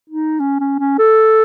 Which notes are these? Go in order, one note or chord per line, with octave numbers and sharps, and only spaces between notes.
D#4
C#4
C#4
C#4
A4